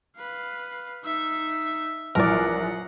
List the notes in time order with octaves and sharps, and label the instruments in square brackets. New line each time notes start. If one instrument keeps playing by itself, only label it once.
[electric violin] B4 F5
D#4 E5
[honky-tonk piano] A#1 F#2 E3 [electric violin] F4 F#5 [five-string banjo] A#4 D5